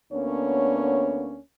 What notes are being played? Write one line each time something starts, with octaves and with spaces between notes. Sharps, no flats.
D2 A#3 B3 C#4 D4 C#5